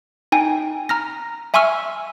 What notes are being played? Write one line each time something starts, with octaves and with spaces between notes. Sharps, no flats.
D#4 G5 G#5
A#5 F6 A#6
E5 G#5 C6 C#6 E6 F6